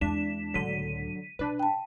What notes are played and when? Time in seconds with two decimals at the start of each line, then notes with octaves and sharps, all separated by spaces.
0.01 E2 G#3 D4 B6 E7
0.54 C#2 A2 D3 F#3 B6 D#7
1.39 B2 D4 B4
1.59 G5 A5